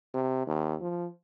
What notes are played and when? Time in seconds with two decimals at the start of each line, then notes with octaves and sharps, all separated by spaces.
0.14 C3
0.47 D#2
0.81 F3